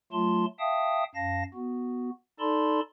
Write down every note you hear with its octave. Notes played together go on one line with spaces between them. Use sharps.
F#3 A3 F4 A5 C6
E5 F5 G5 A5 D#6
F#2 F5 A5 A#6
B3 F#4
D#4 A4 D5 A5 B5 C6